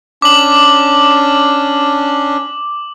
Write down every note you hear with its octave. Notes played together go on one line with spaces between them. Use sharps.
C#4 D4 D6 F#7